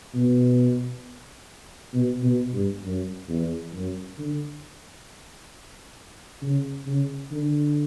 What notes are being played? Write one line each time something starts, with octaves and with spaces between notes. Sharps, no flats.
B2
B2
B2
G2
F#2
E2
F#2
D3
C#3
C#3
D3